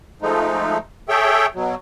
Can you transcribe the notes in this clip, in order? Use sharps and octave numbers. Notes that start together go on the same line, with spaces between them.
F3 G#3 A3 D#4
G#4 A4 C#5 E5 G5
B2 F#3